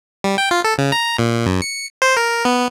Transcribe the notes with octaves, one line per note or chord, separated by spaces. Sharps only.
G3
G5
F4
A4
C#3
A#5
A#2
F#2
C#7
C5
A#4
B3